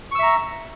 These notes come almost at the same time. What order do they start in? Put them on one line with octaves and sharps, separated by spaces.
C#6 E6 E5 A#5